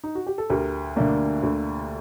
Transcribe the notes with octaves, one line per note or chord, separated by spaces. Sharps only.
D#4
F#4
G4
A4
D2 G4 A#4
D3 A3 A#3 D4
D2